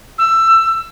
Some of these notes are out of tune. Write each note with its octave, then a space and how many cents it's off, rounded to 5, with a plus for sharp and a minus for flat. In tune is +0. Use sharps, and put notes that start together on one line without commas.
E6 +15